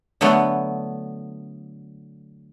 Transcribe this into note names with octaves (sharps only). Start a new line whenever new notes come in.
D3 F#3 A3 B3